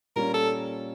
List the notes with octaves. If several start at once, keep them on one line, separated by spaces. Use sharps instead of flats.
A#2 G3 C#4 F4 A#4
A4